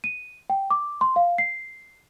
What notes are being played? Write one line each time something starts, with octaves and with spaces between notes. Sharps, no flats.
D#7
G5
D6
C6
F5
C7